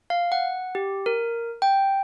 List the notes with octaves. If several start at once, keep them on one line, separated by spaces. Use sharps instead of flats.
F5
F#5
G4
A#4
G5